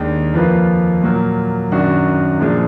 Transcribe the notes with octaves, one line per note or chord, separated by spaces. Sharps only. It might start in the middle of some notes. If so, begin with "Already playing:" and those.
Already playing: D#2 D#3 G#3 D4
F2 F3 A#3 F4 B4
A#2 F#3 A#3
F#2 D#3 F#3 D4 F#4
A#2 F3 G#3 D4